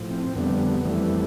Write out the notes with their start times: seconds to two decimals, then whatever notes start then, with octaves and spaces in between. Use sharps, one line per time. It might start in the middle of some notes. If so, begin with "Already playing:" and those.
Already playing: A2 F3
0.10 C4
0.35 F2 D3 G3 B3
0.85 F2 E3 G3 A3